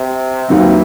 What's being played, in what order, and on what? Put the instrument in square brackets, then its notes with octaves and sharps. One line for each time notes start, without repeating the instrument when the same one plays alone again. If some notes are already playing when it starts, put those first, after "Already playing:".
Already playing: [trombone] C3
[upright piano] D#2 D#3 F#3 C4 [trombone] E3